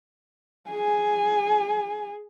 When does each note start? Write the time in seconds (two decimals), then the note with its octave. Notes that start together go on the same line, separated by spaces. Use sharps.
0.70 G#4 G#5